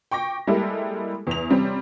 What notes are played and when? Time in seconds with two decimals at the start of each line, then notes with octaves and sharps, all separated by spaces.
0.11 G5 C#6 D6 A#6
0.47 G3 G#3 A#3 E4 G4 A4
1.27 E2 F7
1.50 C3 G3 C4 C#4